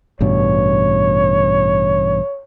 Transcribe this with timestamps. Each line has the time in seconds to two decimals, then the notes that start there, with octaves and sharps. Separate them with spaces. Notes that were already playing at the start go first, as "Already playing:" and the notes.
0.21 A1 G2 B2 C#5